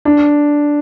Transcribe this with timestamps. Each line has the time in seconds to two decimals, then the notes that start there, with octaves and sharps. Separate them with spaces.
0.05 D4